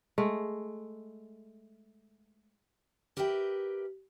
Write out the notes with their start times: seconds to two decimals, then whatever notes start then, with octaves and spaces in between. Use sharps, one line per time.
0.18 G#3 A3
3.17 G4 A#4 B4 E5 G5